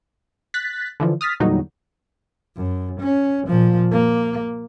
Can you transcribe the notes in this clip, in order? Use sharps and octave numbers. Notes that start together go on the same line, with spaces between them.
F#6 A6 B6
D3 E3 F3
D#6 F6 A6 B6
E2 A#2 D3 F#3 G3 D#4
F#2
C#4
A#2 F3
A#3